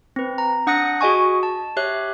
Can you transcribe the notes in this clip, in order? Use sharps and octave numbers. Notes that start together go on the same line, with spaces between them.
C4 B4
A#5
D4 F#5 D#6 F#6 A#6 C#7
F#4 G#4 D#5 G#5 C#6
A5
G4 C#5 E5 F#6